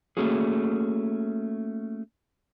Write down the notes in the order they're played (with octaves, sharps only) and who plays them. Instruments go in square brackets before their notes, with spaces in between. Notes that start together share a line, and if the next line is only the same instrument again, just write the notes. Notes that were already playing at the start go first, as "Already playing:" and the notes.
[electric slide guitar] A3 A#3 C#4 F#4 G#4